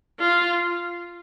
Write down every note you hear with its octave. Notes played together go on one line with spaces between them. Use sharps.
F4